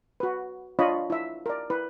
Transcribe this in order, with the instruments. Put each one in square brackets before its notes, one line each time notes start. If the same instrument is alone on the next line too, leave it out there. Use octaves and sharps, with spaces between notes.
[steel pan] F#4 B4
D4 F4 C#5 D#5 B5
E4 E5
A#4 D5
E4 B4